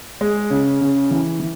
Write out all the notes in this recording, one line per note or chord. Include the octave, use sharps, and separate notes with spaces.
G#3
C#3
C#3
E3
E3